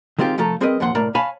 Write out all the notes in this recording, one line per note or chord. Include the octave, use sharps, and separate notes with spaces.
D#3 G#3 C4 F4 G4
C2 F3 A3 A4 A#5
G3 C4 G#4 A#4 B4 D#5
D#2 A#2 F3 F#5 C6
C2 A2 A3 A#4 D5 A#5
C#5 F5 G#5 A5 B5